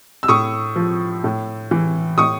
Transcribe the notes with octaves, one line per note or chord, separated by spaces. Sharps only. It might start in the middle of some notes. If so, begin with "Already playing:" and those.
E6
A2 C#6 D#6
F3
A2
E3
A2 C#6 D#6